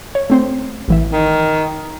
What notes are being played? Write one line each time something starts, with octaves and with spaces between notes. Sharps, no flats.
C#5
A3 C4 C5
A1 E3 E5
D#3